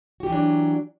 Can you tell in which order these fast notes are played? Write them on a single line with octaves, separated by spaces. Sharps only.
F#4 G4 E3 F#3 D4